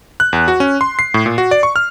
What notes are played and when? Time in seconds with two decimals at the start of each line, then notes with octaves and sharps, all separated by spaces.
0.20 F#6
0.33 E2
0.48 F#4
0.60 C#4
0.81 C6
0.99 C7
1.14 A2
1.26 A#2
1.38 F#4
1.51 D5
1.63 C#6
1.76 F6